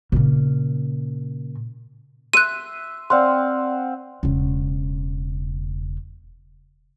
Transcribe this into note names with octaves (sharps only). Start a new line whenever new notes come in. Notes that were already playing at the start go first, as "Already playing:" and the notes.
A#2 C#3
E5 C6 F#6 D#7
C4 D5 F5 F#5 C6
E1 C#3